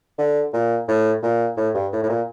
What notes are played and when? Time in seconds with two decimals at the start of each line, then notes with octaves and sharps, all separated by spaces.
0.18 D3
0.54 A#2
0.88 A2
1.23 A#2
1.57 A2
1.75 G2
1.92 A2
2.03 A2
2.09 A#2